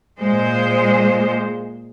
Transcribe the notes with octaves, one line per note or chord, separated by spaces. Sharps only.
A#2 G#3 C5